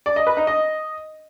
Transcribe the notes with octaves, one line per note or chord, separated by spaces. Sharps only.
D5
D#5
B4
D#4
D#5